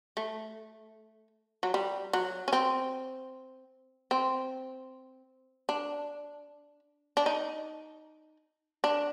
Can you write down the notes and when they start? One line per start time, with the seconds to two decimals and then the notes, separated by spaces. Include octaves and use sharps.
0.17 A3
1.63 F#3
1.74 G3
2.13 F#3
2.48 C#4
2.53 C4
4.11 C4
5.69 D4
7.17 D4
7.26 D#4
8.84 D4